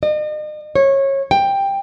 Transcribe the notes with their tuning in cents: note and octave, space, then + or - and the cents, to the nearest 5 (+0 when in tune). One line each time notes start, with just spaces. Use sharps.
D#5 -40
C#5 -20
G5 +10